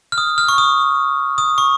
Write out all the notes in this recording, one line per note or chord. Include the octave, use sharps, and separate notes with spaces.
F6
D#6
F6
C#6
D#6
D#6
C#6